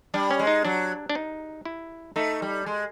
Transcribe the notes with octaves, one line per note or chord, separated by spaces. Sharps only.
G3 D4
C#4
G#3
D#4
F#3 D4
D4
D#4
E4
A3 D#4
G3
G#3